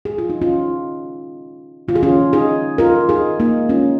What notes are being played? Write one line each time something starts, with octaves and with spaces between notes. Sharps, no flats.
A#2 G#3 G#4
F4
D#4
C#4 F4
D#3 A#3 F4
G#4
C#4 F4
D#4 G#4
F4 A#4
D#4 G#4
A#3 D#4
C#3 G#3 C#4 F4